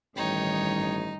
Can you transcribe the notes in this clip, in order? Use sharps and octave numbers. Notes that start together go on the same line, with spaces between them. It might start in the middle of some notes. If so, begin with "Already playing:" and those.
A1 G2 D#3 D#4 C#5 G5